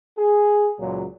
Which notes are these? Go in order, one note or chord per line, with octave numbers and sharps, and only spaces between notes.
G#4
C#2 A#2 F#3